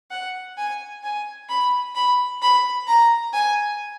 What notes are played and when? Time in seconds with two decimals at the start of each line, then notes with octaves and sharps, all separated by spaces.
0.11 F#5
0.57 G#5
1.03 G#5
1.49 B5
1.95 B5
2.42 B5
2.87 A#5
3.33 G#5